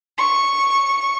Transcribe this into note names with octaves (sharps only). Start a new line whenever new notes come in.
C#6